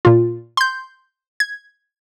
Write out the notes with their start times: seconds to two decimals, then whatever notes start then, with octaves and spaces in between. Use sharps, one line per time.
0.05 A#2 F4
0.57 C6 G6
1.40 G#6